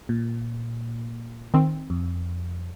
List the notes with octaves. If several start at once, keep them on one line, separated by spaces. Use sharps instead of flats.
A#2
D#3 C4
F2